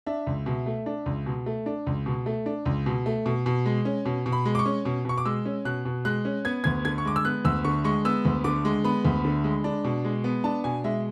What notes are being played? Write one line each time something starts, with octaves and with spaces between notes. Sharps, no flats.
D4 E5
C#2
B2
A3
D4
C#2
B2
A3
D4
C#2
B2
A3
D4
C#2
B2
A3
B2
B2
G#3
C#4
B2
B2
B5
G#3
D6
C#6
C#4
B2
B2 C#6
D6
G#3 E6
C#4
B2 F#6
B2
G#3 F#6
C#4
B3 G#6
D2 G#6
D3 G#6
C#6
G#3 D6
E6
B3 F#6
D2 E6
D3 C#6
G#3 C#6
B3 E6
D2
D3 D6
G#3
B3 B5
D2
D3
G#3
D4
B2
G#3
B3
D4 A5
B2 G#5
G#3 E5